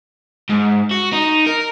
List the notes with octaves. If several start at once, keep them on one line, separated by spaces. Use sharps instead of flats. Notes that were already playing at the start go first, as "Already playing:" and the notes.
G#2
F#4
D#4
A#4